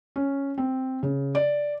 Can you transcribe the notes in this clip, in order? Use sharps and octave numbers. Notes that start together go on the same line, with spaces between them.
C#4
C4
C#3
D5